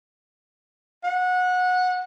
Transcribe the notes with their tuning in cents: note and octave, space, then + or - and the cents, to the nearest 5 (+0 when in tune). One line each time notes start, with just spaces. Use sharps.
F#5 -20